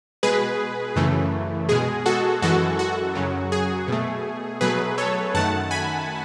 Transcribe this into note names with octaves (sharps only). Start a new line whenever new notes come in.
B2 G#3 G#4 B4
F#2 C#3 E3 A3
B2 G#3 G#4
F#4 A4
F#2 E3 G#3 F#4 A4
F#4
F#2 C#3 F#3
G#4
B2 A3
B2 F#3 A3 G#4 B4
A4 C#5
F#2 D#3 A3 F#5 A5
G#5 B5